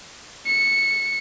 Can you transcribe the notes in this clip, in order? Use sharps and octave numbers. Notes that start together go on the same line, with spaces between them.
C#7